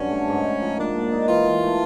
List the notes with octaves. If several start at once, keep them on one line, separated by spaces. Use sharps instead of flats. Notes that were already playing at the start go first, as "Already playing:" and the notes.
Already playing: G2 D3 F#3 C#4
A3
G#2
D#4
F3
A#3 D4
G#2
D#4
E3 F4
E3
A3